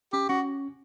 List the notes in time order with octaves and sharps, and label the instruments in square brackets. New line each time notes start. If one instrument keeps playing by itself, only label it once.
[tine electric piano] C#4 [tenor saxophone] G4
[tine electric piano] C#4 [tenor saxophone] F#4